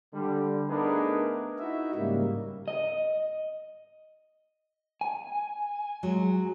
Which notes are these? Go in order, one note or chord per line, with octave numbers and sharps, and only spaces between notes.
D3 G3
A3 B3 D4 D#4 G#4 A#4
D#4 E4 F#4 E5
G#2 C#3 G3 A#3
D#5
G#5
F#3 G#3